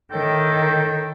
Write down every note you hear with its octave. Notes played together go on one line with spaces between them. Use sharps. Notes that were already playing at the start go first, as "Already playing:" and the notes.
A2 D#3 A4 G5